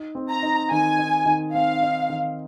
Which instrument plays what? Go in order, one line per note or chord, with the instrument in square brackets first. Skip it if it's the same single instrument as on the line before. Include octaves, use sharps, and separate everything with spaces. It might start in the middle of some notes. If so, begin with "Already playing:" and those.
Already playing: [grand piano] D#4
C4
[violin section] A#5
[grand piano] D#4
[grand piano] D#3 [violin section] G#5
[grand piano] D#4
D#3
[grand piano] C4 [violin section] F5
[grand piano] D#4
D#3